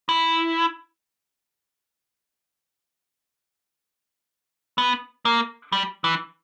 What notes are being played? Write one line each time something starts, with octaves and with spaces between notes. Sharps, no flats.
E4
B3
A#3
G3
E3